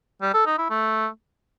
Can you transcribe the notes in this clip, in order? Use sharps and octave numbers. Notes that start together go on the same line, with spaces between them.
G3
A4
D#4
E4
A3